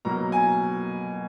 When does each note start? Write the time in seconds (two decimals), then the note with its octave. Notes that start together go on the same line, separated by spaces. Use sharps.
0.05 B2 F#3 A#3 A#5
0.32 G#5